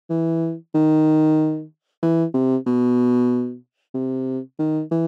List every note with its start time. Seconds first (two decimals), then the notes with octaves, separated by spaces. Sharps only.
0.10 E3
0.75 D#3
2.02 E3
2.34 C3
2.66 B2
3.94 C3
4.59 D#3
4.91 E3